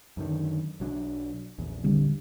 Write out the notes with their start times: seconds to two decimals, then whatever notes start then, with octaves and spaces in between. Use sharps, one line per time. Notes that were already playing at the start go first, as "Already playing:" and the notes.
0.17 F#2 D3 D#3
0.80 B1 F#3 D4
1.58 A#1 E2
1.84 D3 G3 C4